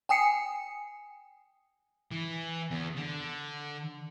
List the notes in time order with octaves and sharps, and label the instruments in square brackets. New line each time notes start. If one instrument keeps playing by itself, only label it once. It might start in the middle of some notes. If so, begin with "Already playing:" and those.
[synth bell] G5 G#5 D#6 C7 C#7
[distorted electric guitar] E3
E2
D3